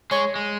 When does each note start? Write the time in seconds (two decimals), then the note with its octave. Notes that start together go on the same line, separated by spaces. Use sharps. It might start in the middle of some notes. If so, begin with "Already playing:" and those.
0.11 G#3 C#5
0.36 G#3